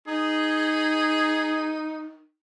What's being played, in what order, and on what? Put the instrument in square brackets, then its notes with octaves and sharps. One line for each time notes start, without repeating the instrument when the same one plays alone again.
[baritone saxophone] D#4 [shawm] G#4